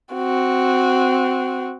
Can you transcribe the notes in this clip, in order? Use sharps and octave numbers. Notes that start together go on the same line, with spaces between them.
C4 F#4